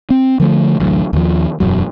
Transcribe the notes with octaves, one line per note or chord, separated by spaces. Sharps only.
C4
D3 F3 A3
A1 D2 F#3
D#2 D#3 F3
E1 F#2 F#3